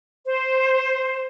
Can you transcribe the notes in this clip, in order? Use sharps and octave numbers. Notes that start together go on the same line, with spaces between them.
C5